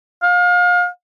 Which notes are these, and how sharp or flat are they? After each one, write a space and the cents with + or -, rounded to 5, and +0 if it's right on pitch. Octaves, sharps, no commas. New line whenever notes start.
F5 +35